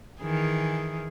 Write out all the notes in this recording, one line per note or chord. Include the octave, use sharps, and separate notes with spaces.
D#3 E3 G#4